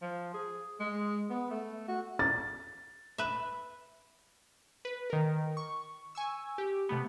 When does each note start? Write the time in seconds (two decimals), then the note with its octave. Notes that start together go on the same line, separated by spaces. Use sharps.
0.01 F3
0.34 G#4
0.80 G#3
1.30 B3
1.50 A3
1.88 F#4
2.19 A6
3.18 B4 E5
4.85 B4
5.10 D#3 A#4
5.57 C#6
6.15 G#5 C#6 E6
6.58 G4
6.89 C3 A3 B3